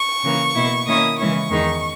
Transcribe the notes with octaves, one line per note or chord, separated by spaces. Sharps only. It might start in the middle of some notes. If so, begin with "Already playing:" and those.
Already playing: C#6
C#3 E3 A#3
B2 A#3 E4
D#3 A#3 C#4 E4 D#6
C#3 E3 G#3 C#4 E4 C#6
E2 D#3 G#3 D#4